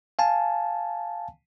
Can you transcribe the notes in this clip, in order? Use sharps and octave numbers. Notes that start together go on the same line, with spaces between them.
F5 G#5 A5